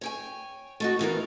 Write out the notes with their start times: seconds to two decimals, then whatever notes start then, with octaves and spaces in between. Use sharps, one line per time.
0.01 C#5 G5 G#5
0.80 A3 D#4 F#4
0.99 D#2 E3 B3 A#4